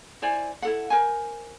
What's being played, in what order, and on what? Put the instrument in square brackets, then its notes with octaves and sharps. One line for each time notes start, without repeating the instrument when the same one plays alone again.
[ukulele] E4 C5 D5 G#5
E4 A4 F#5
A#4 C5 G#5